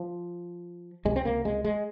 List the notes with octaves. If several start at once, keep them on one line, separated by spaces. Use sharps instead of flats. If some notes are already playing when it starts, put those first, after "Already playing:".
Already playing: F3
C#2 C3 G#3
C4
A#3
G#3
G#3